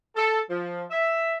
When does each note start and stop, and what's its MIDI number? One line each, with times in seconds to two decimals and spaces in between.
0.16 0.40 69
0.50 0.84 53
0.90 1.34 76